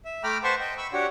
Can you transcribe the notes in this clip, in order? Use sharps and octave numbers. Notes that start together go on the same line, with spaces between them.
E5
A3 G5 A#5 B5 D6 F6
B4 C5 F#5 A5 C6 C#6
D#5 G5
B5 C#6 E6
D4 F#4 G4 C#5 F#5